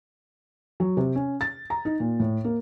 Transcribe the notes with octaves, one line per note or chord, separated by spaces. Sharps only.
F#3
C3
C#4
A6
A#5
D#4
A#2
A2
A#3